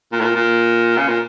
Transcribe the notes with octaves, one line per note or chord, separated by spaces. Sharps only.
A#2
A2
A#2
A#2
C#3
A#2